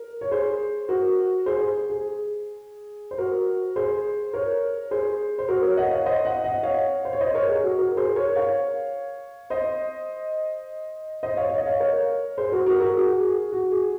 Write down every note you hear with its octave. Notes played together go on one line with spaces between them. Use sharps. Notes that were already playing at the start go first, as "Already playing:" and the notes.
Already playing: A#4
C#5
G#4 C5
F#4 A#4
G#4 C5
G#4
G#4
C5
F#4 A#4
G#4 C5
A#4 C#5
G#4 C5
C5
F#4 A#4
A#4 C#5
D#5 F#5
C#5 F5
C5 D#5
D#5 F#5
D#5 F#5
C#5 F5
C5
C#5
C5 D#5
A#4 C#5
A#4
G#4
F#4
F#4 A#4
G#4 C5
A#4 C#5
C#5 F5
C5 D#5
C5 D#5
C#5 F5
C#5
D#5
C#5 F5
A#4 C#5
G#4 C5
F#4 A#4
F#4 A#4
F#4 A#4
G#4
F#4
G#4
F#4
G#4